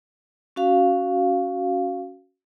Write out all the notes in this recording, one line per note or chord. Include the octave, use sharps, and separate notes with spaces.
C#4 F#4 F5